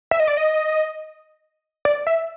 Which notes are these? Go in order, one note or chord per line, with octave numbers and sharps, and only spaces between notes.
E5
D#5
D5
D#5
D5
E5